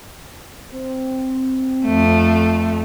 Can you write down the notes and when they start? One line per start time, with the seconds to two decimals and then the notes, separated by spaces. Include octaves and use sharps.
0.72 C4
1.85 F2 A3